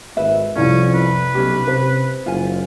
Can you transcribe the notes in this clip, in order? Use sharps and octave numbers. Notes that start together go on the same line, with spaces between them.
G#1 B4 E5
C2 F2 C#4 E4 F4 D5
B4
B1 C#4 G4
C3 C5
F#1 F4 G#5